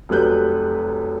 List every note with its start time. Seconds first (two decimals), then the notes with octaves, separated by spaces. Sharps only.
0.09 F1 F#2 G3 B4 F#6 G6